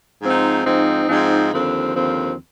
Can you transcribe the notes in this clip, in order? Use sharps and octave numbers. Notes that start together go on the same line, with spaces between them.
G#2 F3 C4 D#4
G#2 F3 C4 D#4
G#2 F3 C4 D#4
D#2 D3 F3 C4
D#2 D3 F3 C4